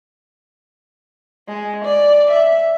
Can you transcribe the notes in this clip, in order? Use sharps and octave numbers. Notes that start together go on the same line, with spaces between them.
G#3
D5
E5